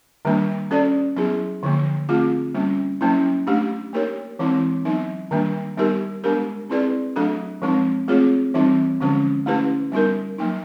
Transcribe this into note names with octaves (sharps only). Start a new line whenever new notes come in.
D#3 G3 A#3 D4
C#4 F#4 A4 D5
F#3 B3 E4 G#4
D3 F3 A#3
A3 C4 F4 G#4
G3 A#3 C#4
F#3 A#3 C#4 E4
A3 D4 G4
A#3 D#4 G4 A#4 C#5
E3 G#3 C4 E4
F#3 B3 D#4
D#3 G3 A#3 D4
G3 B3 D#4 G4 A#4
G#3 B3 D4 G4 A#4
C4 E4 G#4 B4 D5
F#3 A3 D4 F#4 A4
F3 G#3 C4 D#4
A3 C4 F4 G#4 C#5
E3 G3 C4 D#4
D3 F3 G#3 C#4 F#4
A3 C#4 E4 G4 B4
G3 B3 D#4 F#4 A#4
F#3 A#3 D#4